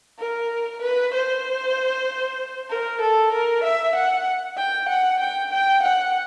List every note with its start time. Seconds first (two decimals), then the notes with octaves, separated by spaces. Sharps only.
0.19 A#4
0.82 B4
1.14 C5
2.69 A#4
3.01 A4
3.32 A#4
3.64 E5
3.95 F#5
4.57 G5
4.89 F#5
5.20 G5
5.52 G5
5.83 F#5